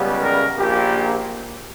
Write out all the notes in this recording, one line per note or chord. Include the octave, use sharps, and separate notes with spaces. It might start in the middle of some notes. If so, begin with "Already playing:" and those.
Already playing: C#2 C#3 G3 B3
A#4
A#1 A#2 A#3 G4